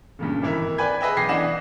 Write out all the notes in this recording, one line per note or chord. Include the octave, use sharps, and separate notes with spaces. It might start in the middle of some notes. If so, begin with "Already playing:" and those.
G2 A#2 C#3
G#1 E3 E4 A#4
B4 D5 G5 G#5 B5 G#6
G#4 B4 D#5 E5 G5
B1 G5 D6 G#6 A#6 C7
E3 D4 D#5 F#5 G5 E7